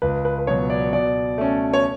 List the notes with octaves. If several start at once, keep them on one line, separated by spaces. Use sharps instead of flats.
C#2 B4
B4
B4
B2 F#3 C#5
D5
B2 D5
A3 C#4
C#5